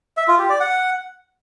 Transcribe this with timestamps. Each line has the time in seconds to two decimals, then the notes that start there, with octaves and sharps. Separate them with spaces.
0.17 E5
0.28 F4
0.39 G4
0.49 D5
0.60 F#5